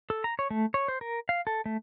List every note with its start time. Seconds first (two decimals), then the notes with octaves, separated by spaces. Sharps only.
0.10 A4
0.24 A#5
0.39 C#5
0.51 A3
0.74 C#5
0.88 C5
1.01 A#4
1.29 F5
1.47 A4
1.66 A3